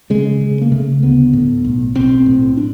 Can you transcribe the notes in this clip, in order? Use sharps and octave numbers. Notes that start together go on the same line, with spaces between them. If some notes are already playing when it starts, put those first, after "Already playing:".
C#3 G#3
C#3
A#3
C#3 A3
D2 B3
A2
B1
B1 C4
A2
D4